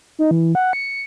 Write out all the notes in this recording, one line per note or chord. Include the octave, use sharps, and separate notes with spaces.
D#4
E3
F#5
C#7